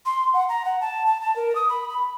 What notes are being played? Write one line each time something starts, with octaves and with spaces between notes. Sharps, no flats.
C6
F#5
A#5
F#5
A5
A5
A5
A#4
D#6
B5
B5